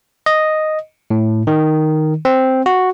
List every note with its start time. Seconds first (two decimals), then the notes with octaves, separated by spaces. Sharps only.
0.26 D#5
1.10 A2
1.47 D#3
2.25 C4
2.66 F#4